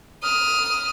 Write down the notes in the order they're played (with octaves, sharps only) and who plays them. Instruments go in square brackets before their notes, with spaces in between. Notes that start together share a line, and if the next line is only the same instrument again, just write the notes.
[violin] D#6 F6